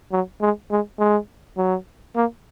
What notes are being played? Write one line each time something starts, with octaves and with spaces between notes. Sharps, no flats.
F#3
G#3
G#3
G#3
F#3
A#3